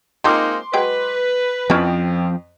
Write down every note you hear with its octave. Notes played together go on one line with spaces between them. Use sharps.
F3 G#3 A#3 C4 D#4 F4 C6 D6
F#3 G#3 B4 G5
F2 F3 C4 C#4 E4